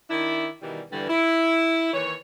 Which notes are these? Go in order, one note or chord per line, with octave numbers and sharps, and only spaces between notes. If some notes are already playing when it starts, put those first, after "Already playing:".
D#3 D4 E4
B2 D#3 E3 G3
G2 D3 E3 G3
E4
D#2 E3 C#5